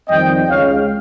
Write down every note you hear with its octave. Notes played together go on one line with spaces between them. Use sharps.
F2 D#3 G3 C4 D#5 G5
C#2 C#3 G#3 C#5 F5